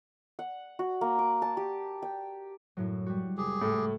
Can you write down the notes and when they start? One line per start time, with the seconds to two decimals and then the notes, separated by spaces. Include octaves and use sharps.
0.39 F#5
0.79 F#4
1.01 A#3
1.19 D6
1.42 A5
1.57 G4
2.03 G5
2.77 F#2 A2 F#3
3.06 G3 F#4
3.37 F#1 G#3 G4 G#4
3.61 A2